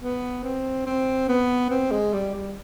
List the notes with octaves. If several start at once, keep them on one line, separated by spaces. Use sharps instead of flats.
B3
C4
C4
B3
C4
G#3
G3
G3